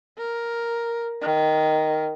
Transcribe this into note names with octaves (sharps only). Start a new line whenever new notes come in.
A#4
D#3